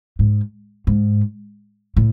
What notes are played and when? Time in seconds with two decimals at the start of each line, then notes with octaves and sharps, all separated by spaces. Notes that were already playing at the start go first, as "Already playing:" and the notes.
0.19 G#2
0.87 G#2
1.97 A2